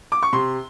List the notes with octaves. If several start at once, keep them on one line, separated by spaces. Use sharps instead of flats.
D6
C#6
C3 C6